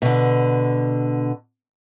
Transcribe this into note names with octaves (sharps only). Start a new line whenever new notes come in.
B2 D3